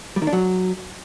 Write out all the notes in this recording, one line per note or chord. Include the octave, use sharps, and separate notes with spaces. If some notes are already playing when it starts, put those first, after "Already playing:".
G3
D#3
D4
F#3